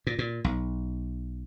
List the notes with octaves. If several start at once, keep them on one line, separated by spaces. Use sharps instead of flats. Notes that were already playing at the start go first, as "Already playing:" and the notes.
A#2
A#2
B1